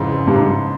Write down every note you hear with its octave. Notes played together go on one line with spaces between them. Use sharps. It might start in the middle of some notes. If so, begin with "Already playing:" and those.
Already playing: F2 G#2 C#3 E3 G#3
G2
G#2